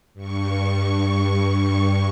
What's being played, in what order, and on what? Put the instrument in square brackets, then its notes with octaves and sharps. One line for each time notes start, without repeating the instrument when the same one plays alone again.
[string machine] G2 C#6